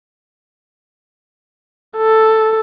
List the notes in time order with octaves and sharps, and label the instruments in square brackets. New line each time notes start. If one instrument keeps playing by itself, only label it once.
[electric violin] A4